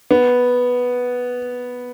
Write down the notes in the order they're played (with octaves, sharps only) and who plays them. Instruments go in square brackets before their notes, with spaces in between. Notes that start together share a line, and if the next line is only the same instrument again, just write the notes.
[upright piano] B3